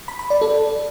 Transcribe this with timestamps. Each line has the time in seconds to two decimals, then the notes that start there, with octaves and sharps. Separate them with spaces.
0.08 B5
0.19 B5
0.30 D5
0.41 A4